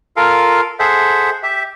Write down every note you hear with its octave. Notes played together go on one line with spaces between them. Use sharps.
F4 A4 A#4 F5
G#4 A4 C5 E5 F#5
G4 E5